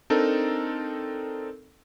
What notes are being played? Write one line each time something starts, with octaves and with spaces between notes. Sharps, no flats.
C4 D4 D#4 A4 A#4